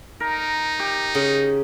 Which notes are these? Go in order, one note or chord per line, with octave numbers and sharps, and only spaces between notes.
D#4 A#4
G4
C#3